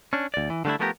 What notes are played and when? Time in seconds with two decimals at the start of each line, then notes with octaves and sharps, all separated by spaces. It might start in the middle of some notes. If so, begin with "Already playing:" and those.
0.13 C#4 D4
0.34 D2 D5
0.50 E3
0.65 D3 G3 A3 D4 E4
0.79 F3 A3 B3 E4 G4 A#4